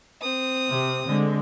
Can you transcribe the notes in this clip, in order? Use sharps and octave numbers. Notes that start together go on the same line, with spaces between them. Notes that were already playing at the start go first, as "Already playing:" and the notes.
C4 D#6
C3
D3 G#3